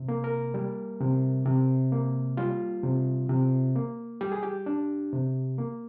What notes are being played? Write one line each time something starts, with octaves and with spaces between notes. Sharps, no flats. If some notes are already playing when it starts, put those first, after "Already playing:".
Already playing: C3
A#3
A#4
G3
C3
C3
A#3
G3 F4
C3
C3
A#3
G3 G4
G#4
G4
D4
C3
A#3